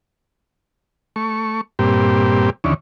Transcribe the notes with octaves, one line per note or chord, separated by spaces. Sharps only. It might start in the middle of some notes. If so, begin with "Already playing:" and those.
A3 C#6
G2 A#2 C4 G4
D#2 D3 E3 C#4